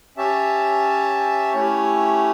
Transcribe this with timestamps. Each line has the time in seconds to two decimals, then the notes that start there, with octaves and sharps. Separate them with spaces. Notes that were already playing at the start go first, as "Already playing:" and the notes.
0.17 C#4 G4 C#5 E5 A5
1.54 A3 C#4 E4 G4 C#5